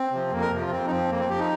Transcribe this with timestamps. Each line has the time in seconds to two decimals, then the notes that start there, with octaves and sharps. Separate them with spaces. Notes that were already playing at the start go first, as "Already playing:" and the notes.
Already playing: C4
0.12 C3 F3
0.31 F2 A#3
0.41 A#4
0.52 C3 F3
0.61 F4
0.71 F2 C4
0.87 D#4
0.90 F3 C4
1.09 F2 A#3
1.19 C4
1.29 F3 G4
1.39 D#4